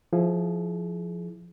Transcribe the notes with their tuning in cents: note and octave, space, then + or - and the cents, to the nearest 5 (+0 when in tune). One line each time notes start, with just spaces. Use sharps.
F3 +0 E4 +0 G#4 +25